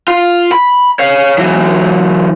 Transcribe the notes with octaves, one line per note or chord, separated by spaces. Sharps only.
F4
B5
C#5 F5
E3 F#3